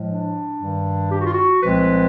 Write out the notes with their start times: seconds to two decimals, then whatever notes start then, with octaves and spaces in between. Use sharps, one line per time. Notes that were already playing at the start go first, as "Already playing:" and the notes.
Already playing: A2 F3 G#3
0.08 D4
0.59 G2 D#3 G3
1.11 G4
1.19 F#4
1.26 F4
1.34 F#4
1.62 C2 A#2 F3 G#3 C4 B4